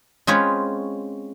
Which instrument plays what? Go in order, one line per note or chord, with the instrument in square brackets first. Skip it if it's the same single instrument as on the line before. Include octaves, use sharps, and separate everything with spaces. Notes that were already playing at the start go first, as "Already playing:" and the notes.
[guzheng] G#3 C4 C#4 F4 B4 C#5